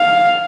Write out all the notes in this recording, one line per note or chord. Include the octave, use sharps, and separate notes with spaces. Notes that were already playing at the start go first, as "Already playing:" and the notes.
Already playing: F5